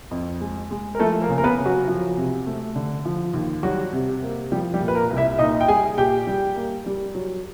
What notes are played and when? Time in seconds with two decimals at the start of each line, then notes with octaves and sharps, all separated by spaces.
0.11 F2
0.41 G#3
0.71 G#3
0.95 A#4
1.00 F3 A3 A4
1.22 A#3 A#4
1.29 C#3
1.38 A#4
1.44 B3 B4
1.58 C#3
1.66 F#3 F#4
1.88 F3
2.17 C3
2.46 A3
2.76 D3
3.05 F3
3.33 D#2
3.63 F#3 G3 F#4
3.92 C3
4.23 A#3
4.52 F3 G3 G4
4.74 G3 G4
4.81 A#2
4.88 B4
4.95 A#3 A#4
5.10 C2
5.17 E4 E5
5.39 A#2 D#4 D#5
5.61 G5
5.68 G3 G#4 G#5
5.97 A#2 G4 G5
6.27 G3
6.56 A#3
6.86 G3
7.15 F#3